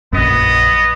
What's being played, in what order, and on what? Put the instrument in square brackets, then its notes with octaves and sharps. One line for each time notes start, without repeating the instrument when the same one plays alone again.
[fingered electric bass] A#1 F#2 [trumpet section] B3 D#5